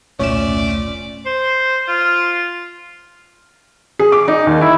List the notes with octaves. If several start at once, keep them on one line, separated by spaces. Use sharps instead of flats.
E1 C2 A#2 A3 C#4 C#5 D5 E7
C5
F4
G#4
D6
D#4
D#2
E4